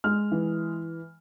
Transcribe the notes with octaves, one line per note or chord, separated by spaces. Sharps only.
G#3 F6
E3